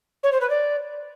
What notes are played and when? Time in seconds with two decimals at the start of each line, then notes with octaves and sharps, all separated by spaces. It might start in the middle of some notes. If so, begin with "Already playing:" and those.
0.23 C#5
0.32 C5
0.41 B4
0.50 D5